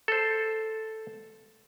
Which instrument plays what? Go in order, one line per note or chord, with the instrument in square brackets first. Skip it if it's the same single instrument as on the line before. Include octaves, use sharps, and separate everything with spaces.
[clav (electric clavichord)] A4 C5